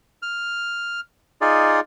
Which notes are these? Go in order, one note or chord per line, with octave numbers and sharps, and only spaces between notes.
F6
D#4 F4 G#4 D5